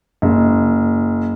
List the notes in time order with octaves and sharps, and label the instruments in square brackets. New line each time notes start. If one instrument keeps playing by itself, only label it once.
[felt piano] F#1